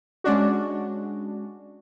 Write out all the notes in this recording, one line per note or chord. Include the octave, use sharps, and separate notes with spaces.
G#3 C#4 D4 F#4